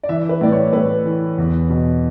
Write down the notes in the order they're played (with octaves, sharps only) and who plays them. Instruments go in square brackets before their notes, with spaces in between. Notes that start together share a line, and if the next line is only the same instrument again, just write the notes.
[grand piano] D5
E3 E5
B4
A2 D5
C#5
A2 B4
E3
E2
B2